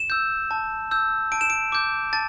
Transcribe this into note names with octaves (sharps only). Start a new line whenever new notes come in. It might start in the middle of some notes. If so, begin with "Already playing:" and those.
Already playing: E7
E6 G6
A5
E6 G6
A5 D7
E7
D7
D6 G6
A5 A6